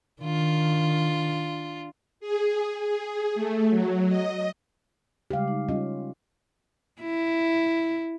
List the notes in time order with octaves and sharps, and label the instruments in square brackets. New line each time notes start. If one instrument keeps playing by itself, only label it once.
[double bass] D#3 [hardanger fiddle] D4 F4
[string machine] G#4
G#4
A3
F#3
D#5
[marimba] C#3 G3 G#3 [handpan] G4 F5
[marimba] D#4
[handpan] G3 C#4 F4 [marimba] D#5
[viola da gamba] E4